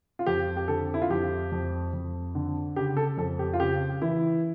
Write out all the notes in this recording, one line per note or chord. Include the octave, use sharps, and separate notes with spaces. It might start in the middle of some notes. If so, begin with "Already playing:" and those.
F4
F2 G4
G4
D3 A4
E4
F4
F2 G4
F2
F2
D3
C#3 G4
A4
F2 A4
G4
F4
C#3 G4
E3 E4